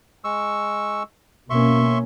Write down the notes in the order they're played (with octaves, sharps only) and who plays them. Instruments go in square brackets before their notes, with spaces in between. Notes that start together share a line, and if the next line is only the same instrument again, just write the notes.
[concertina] G#3 C#6 E6
[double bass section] B2 A#3 C#4 [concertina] E5 C6 C#6